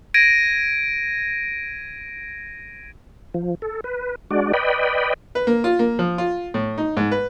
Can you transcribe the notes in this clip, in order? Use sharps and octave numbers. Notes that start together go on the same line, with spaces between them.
G#6 A#6 D7 D#7
F3
A4
B4
G#3 D4 F#4 D5
B4 D5 D#5 G5 B5
B4
A#3
F4
A#3
F3
F4
A2
D#4
G#2
B4